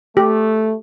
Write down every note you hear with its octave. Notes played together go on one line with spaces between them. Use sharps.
A3 G4